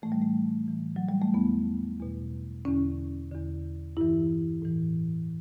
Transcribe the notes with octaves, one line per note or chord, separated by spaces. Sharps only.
A2 E3 A3
G3
A3
A2 E3
F#3
G3
A3
E2 D3 B3
E2 B2
E2 D3 C#4
E2 D3
G2 E3 E4
A2 E3